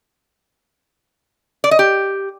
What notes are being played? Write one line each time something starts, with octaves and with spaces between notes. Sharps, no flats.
D5
D#5
G4